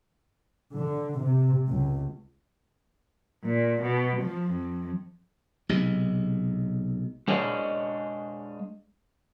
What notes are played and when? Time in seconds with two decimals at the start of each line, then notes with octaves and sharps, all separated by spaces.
0.74 D3
1.20 C3
1.70 C#2
3.44 A#2
3.82 B2
4.21 F3
4.51 F2
5.69 B1 C3 G#3
7.28 G#3 D4 C#5 D#5